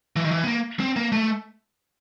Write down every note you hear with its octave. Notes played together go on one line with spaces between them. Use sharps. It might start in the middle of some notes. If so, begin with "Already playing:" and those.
E3
D#3
E3
B3
A#3
C4
A#3
A3